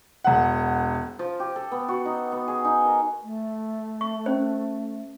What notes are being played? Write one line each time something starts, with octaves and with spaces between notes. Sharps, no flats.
E1 F#5
F3
G4
A4
B3
F#4
D#4
B3
G#4
D#4
A#4
A3
C#6
C#4 C5